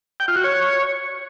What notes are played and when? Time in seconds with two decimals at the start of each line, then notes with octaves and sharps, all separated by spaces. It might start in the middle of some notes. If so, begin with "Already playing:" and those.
0.20 G5
0.28 F4
0.36 F#4
0.44 C#5